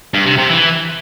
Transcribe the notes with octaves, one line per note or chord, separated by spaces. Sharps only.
G2
C3
C3
E3